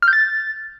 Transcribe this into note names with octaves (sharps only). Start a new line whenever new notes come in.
F6
G6
A6